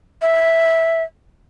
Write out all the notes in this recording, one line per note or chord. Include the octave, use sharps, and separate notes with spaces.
E5